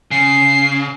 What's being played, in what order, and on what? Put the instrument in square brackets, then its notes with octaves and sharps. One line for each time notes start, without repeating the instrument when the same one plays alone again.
[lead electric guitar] C#3 [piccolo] C7